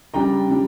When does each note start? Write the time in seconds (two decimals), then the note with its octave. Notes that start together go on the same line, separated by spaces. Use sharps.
0.14 C#3 G3 D4 G5 A#5
0.48 C#3 G3 D4